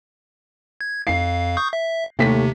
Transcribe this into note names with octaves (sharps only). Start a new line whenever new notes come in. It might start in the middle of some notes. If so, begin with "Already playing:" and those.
G#6
F2 F5 C7
C#6 D#6 G6
E5
D#2 C3 A3 B6